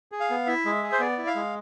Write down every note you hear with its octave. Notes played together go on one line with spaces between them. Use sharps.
G#4
F5
B3
E4 E5
G#3
G#4
C5
B3 D5
E4
F5
G#3